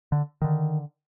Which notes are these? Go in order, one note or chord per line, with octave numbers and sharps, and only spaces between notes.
D3
D3 D#3